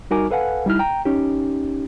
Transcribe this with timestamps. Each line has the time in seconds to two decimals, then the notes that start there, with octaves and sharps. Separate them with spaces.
0.11 G3 D#4 F#4 A#4 G#5 D6
0.31 A4 B4 F5 F#5 G#5
0.66 G3 D#4 E4 F6
0.79 G5 A#5
1.05 C#4 D#4 G4